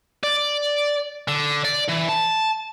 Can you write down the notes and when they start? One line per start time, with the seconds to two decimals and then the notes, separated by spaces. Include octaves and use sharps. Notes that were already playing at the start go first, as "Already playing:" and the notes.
0.23 D5
1.28 D3
1.65 D5
1.88 E3
2.09 A5